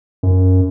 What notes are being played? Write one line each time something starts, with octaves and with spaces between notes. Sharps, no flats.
F#2